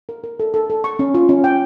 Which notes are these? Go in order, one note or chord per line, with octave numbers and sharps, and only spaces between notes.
A#4
A#4
A4
A4
A4
C#6
C#4
F4
C#4
G5